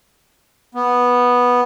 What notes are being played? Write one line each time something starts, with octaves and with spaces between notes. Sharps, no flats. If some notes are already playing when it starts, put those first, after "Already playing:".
B3